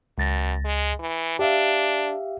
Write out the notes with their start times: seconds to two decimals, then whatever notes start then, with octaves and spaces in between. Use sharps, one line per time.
0.18 C#2 F#2 A6 A#6
0.65 G#3
1.00 E3
1.39 D4 G4 E5 F5